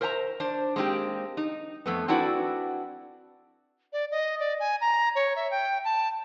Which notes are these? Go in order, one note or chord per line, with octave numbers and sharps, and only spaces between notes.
A#4 C5 E5 G#5 A#5
D4 C5
G#3 A#3 C4 D4 G4
D#4
F2 A3 B3
C4 D4 E4 F#4 B4 D5
D5
D#5
D5
G#5
A#5
C#5
E5
G5
A5